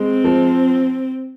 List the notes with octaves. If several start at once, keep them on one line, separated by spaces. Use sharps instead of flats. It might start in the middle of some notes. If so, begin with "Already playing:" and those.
Already playing: G#3 C4
F3